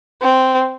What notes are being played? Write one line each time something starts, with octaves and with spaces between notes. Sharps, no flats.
C4